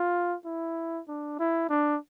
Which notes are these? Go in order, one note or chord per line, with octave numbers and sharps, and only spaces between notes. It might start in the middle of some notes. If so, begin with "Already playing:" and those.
Already playing: F4
E4
D4
E4
D4